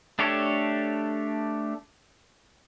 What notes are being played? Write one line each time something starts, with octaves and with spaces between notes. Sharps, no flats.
A3 D4 G4 A4 C#5